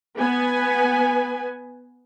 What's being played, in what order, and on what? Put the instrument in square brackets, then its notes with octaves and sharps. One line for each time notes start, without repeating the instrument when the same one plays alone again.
[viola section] B3 B4 G#5